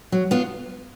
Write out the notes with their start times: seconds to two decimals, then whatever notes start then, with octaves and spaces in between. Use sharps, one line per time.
0.12 F#3
0.31 B3 D4 F4